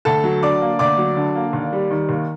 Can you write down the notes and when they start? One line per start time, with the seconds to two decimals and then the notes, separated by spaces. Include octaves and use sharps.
0.05 D2 A4 A5
0.24 F#3
0.42 D3 D5 D6
0.61 A#3
0.79 D2 D5 D6
0.97 F#3
1.17 D3
1.35 A#3
1.53 D#2
1.73 G3
1.91 D#3
2.09 D#2